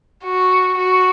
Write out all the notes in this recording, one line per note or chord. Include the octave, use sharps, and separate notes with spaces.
F#4
F#4